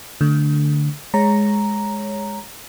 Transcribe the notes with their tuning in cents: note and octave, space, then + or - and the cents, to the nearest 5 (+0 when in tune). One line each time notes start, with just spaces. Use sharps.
D3 +0 A3 +10
G#3 +0 C#5 +0 A#5 +0